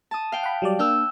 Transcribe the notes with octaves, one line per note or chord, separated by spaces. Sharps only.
A5 D#6
F5 G5
F#5 B5
F#3 G3 D5
A#3 D4 E6 F6 G6